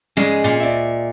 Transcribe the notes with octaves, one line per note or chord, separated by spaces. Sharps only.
G#3 C#4 G#4 D5
A#2
D5 E5